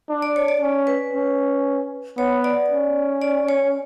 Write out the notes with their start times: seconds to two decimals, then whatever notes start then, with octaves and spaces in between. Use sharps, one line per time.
0.09 D4
0.22 D5
0.36 C#5
0.48 D5
0.61 C#4
0.87 B4
1.13 C#4
2.18 B3 C#5
2.44 D5
2.70 C#4
3.22 D5
3.49 C#5